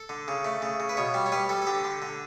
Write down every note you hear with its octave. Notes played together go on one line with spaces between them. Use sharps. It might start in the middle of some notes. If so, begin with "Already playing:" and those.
Already playing: A4
D3
C#3
A3
C#3
C#3
B4
B2 C#5
G3
C#5
G3 B4
G3 A4
A4
D3 G4
D3
D3